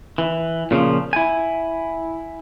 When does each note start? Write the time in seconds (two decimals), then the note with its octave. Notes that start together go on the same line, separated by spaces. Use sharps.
0.18 E3
0.71 A#2 C#3 E3 F3
1.13 E4 G#5